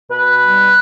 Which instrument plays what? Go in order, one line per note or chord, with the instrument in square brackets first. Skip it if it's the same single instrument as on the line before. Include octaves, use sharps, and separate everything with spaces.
[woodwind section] B2 B4
G3